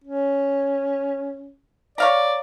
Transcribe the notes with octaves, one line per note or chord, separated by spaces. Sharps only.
C#4
C#5 D5 F5 A#5